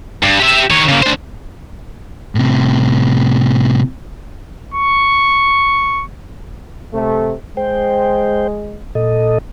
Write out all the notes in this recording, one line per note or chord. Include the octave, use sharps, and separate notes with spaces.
G2
G4 E5
D#3 C#5
C#3 A#3
D4 C5
A2 C3
C#6
C3 A3
G#3 C5 G5
A#2 A4 D#5